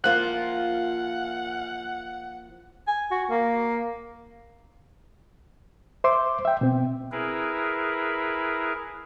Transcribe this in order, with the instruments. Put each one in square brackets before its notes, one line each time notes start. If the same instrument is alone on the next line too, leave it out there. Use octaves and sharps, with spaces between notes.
[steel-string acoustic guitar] F3 A#3 F4 [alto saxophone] F#5 [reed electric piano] F#6
[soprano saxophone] G#5
F#4
A#3
[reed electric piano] C5 E5 C6 D6
E5 G5
B2 C4
[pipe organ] E4 G#4 A#4 B4